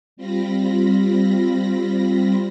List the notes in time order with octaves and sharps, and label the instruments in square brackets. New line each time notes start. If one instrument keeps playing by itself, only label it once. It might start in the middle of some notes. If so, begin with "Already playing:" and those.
[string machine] G3 C4 F4 B5 A#6